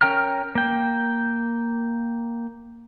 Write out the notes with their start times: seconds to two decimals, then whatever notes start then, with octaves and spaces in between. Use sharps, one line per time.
0.01 C#4 A#4 G5 A#5 F6
0.55 A#3 G5